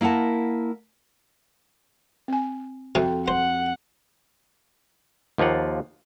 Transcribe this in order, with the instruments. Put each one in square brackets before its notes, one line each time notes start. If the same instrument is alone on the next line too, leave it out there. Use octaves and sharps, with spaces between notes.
[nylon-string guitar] A#3 E4 A#4 F#5 A5
[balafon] C4 G#5
[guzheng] F2 [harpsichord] C3 [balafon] F#4 A4
[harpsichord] C5 [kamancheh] F#5
[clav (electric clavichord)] D#2 F3 A#3 F4 F#5